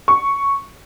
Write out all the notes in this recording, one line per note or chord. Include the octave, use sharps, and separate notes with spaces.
C#6